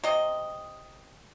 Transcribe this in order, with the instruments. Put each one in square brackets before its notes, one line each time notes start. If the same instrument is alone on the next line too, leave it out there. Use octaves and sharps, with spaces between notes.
[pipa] C3 D#5